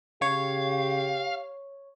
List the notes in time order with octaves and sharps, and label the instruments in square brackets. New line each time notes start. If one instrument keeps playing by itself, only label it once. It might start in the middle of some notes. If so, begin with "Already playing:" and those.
[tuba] C#3 [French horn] G4 [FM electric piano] C#5 [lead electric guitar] F5